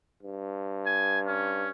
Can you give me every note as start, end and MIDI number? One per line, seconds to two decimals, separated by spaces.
0.23 1.71 43
0.86 1.20 80
1.26 1.70 61